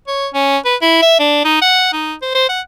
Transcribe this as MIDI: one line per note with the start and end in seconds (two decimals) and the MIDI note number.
0.08 0.28 73
0.34 0.58 61
0.65 0.75 71
0.82 1.01 64
1.02 1.18 76
1.19 1.42 62
1.45 1.59 63
1.62 1.93 78
1.93 2.14 63
2.22 2.31 72
2.34 2.46 72
2.49 2.61 78